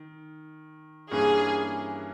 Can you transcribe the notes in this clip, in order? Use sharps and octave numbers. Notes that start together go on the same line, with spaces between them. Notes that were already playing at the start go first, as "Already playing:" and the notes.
Already playing: D#3
G2 E3 A#3 C#4 G#4